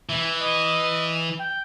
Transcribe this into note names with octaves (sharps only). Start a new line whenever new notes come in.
E3 E5
D#5
G5